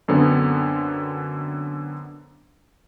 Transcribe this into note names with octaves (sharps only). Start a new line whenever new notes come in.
F#2 D3 B3 C4